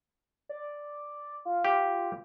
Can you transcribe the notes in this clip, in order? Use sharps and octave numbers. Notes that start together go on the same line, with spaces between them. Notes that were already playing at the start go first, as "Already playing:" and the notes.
D5
F4
F4 G4